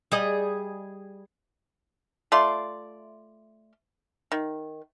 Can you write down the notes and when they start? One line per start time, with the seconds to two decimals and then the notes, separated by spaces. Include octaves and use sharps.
0.12 G3 G#4 D#5
2.32 A3 F4 D5 C6
4.32 D#3